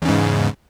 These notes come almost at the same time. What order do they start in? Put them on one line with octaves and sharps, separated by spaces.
E2 C#3 G#2